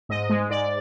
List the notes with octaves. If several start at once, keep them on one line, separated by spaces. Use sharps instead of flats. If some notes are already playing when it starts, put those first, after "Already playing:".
G#2 D#5
G#3
G#2 D5